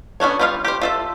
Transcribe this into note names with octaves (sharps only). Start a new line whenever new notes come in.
B3 C#4 D4 C#5
G3 B3 F4 C#5 F5
G4 C5
F4 A4 E5